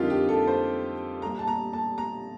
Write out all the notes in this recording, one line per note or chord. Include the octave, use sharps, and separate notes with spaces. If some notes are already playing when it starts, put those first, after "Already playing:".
Already playing: F2 D3 G3 A#3 D#4 F4 G4
G4
A4
C5
A#1 A#2 G3 A#5
A5
A#5
A5
A#5